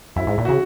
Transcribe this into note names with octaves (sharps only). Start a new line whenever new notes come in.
F#2 E4
G#2
A#2
C#3 F#4